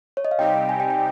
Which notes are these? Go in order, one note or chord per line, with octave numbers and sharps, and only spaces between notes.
C#5
D#5
F5
C3 G3 C4 D#4 G4 G5
G#5
G5
G5